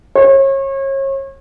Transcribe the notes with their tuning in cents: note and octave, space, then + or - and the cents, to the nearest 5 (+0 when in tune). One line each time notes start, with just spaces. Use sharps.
C#5 -35